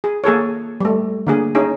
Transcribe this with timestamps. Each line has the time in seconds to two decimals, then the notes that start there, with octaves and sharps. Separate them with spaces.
0.04 G#4
0.24 A#3 G#4 A4 C#5
0.81 G3 A3
1.27 D3 A#3 G#4
1.55 C#4 D#4 G#4